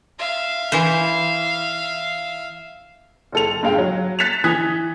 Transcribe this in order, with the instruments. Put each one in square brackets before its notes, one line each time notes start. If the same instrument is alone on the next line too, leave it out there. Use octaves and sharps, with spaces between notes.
[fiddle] E5 F5
[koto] E3 E4 C5
[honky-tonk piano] F#1 A4 F7
G2 G#3 F5 G5
F#3
F#6 A6 B6 C#7 E7 F7
E3 D#6 F#6 G#6 B6